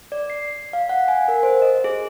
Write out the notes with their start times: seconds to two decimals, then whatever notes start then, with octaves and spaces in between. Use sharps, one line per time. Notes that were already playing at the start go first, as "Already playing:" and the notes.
0.12 D5
0.30 C7
0.73 F5
0.89 F#5
1.08 G#5
1.28 A#4
1.43 C5
1.62 D#5
1.84 G#4